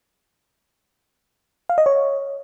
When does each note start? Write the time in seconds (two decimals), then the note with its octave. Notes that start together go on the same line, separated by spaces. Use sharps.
1.69 F5
1.78 D#5
1.86 C#5